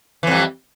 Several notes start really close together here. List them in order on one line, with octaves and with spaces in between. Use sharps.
E3 F2 G3